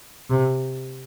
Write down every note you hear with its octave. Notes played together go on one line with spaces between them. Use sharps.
C3